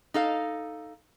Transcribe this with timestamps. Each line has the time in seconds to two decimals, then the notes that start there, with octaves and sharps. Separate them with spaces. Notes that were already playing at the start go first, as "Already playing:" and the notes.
0.14 D#4 A4 F5